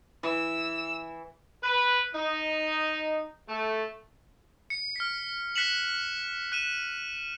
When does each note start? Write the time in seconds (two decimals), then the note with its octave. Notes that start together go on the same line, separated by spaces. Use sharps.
0.23 E3 E6
1.64 B4
2.15 D#4
3.49 A3
4.70 C#7
4.96 F6 B6
5.56 F#6 B6 C#7 E7 F#7
6.52 F#6 D#7 E7